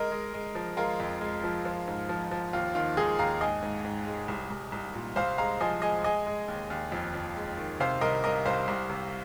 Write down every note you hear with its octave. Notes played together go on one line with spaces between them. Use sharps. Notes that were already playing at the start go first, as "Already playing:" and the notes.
Already playing: G#3 A#4 D#5
G#3
G#3
F3
G#3 F4 A#4
F2
G#3
F3
F3
G#2
F3
F3
D#2 F4
D#3 F4
G#3 D#4 G#4
D#2 F5 A#5
G#2 D#5 G#5
G#2
G#2
G#3
C2
C2
C2
A#2
C2 C5 F5
G#3 F5 A#5
F3 D#5 G#5
G#3 D#5 G#5
G#3 D#5 G#5
G#3
D#2
D#2
F2
F2
G#3
D#3
C3 C5 F5
C2 A#4 D#5
C2 A#4 D#5
C2 C5 F5
C2
C3